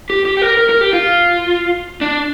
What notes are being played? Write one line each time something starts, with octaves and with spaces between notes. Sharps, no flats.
G4
G4
G4
A#4
A#4
A#4
G4
F4
D4